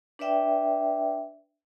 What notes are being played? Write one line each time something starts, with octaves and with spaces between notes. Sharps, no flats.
D4 B4 D5 E5 G5